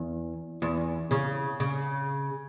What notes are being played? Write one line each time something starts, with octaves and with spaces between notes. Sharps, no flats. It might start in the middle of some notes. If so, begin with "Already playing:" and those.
Already playing: E2
E2
C#3
C#3